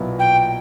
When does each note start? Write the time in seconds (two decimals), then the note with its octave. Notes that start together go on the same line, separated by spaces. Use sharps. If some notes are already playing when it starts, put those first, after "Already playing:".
Already playing: B1 A#2 F#3 B3 E4
0.19 G5